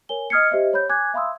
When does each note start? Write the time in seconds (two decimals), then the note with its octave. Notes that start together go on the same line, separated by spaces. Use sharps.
0.09 A#4 C#5 G#5 G7
0.30 D#5 D#6 F6 G#6 C7 C#7
0.51 G4 C5 D#5 E5
0.73 C#5 B5 G6
0.89 G#5 D6 F#6 G#6
1.14 E5 F5 B5 C6 D#6 E6